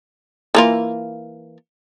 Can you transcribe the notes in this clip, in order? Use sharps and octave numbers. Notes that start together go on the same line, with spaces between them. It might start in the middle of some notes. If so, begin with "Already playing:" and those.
E3 A#3 F4